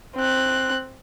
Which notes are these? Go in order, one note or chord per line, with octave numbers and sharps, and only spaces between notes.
C4 F#6